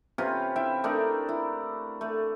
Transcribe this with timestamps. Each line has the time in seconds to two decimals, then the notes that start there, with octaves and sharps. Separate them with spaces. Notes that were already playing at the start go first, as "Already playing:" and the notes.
0.18 C3 C#4 F4 B4
0.56 E4 E5 G5
0.84 A3 D4 D#4 A#4
1.29 E4
2.01 A3